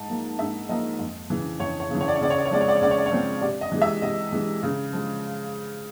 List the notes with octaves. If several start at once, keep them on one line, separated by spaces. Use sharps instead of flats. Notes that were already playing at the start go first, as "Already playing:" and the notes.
Already playing: G#2 A5
F3 A#3
G#2 E5
F3 A#3 D#5
F2
C#3 E3
F2 C#5
C#5
C#3 E3
C#5
D5
C#5
C#3 D5
C#5
D5
C#5
F3 G#3 C4 D5
C#5
D5
C#5
C#3 D5
C#5
D5
C#5
F3 G#3 C4
C3 D5
D#5
E3 G#3
E5
C3 D#5
E3 G#3
C#3
F3 G#3